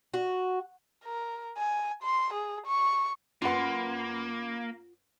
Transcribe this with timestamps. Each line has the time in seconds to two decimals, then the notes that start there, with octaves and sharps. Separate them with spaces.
0.14 F#4
1.05 A#4
1.57 G#5
2.03 C6
2.33 G#4
2.66 C#6
3.42 F#2 A#3 F4 B4 F#5 C6